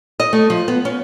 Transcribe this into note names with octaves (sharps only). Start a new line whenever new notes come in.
D#5
A3
F3
B3
C#4